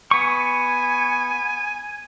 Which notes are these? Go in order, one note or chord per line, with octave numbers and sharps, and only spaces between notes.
B3 G#5 C#6